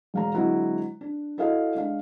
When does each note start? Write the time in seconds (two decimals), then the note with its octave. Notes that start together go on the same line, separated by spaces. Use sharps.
0.14 E1 F5 A#5
0.35 D3 F#3 G#3 C4 E4 F#4
1.01 D4
1.38 E4 F#4 A4 D#5 F5
1.75 G#3 D4 F5